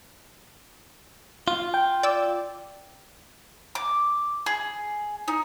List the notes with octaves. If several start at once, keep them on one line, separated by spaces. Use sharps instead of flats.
F4
G5
D5 E6
D6
G#4
D#4